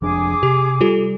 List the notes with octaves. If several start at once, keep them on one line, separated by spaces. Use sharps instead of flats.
F1 F2 D4 G#4 D6
C3 G4
G3 F4 G4 A4